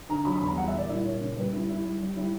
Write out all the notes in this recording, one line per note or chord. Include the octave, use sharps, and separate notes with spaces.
D3 A#5
F#3 B5
B5
E2
A#5
G3 F#5
E5
A#2 D5
G3 E4
A#2 C#5
C#3
G3 B4
G3 E4
G3 E4
G3
G3
G3 E4